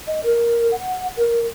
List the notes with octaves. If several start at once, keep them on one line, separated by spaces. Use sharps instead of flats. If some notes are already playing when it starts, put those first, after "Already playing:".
D#5
A#4
F#5
A#4